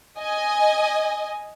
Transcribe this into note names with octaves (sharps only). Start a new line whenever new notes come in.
D#5 G#5